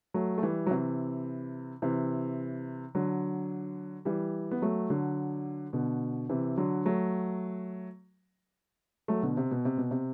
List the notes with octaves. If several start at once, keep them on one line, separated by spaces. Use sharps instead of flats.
F#3 A3
A3
E3 G3
F#3
C3 E3
C3 E3
D3 F#3
E3 G3
B3
F#3 A3
D3 F#3
B2 D3
C3 E3
D3 F#3
F#3 A3
F#3 A3
B2 D3
C3
B2
C3
B2
C3